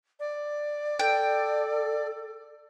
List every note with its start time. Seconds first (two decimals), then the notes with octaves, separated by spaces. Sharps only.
0.20 D5
0.99 A4 G5